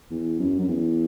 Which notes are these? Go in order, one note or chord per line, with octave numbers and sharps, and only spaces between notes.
E2
F#2
F#2
E2